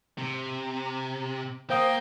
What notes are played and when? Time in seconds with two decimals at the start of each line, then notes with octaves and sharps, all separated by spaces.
0.18 C3
1.70 A#3 C5 F5 G5 D#6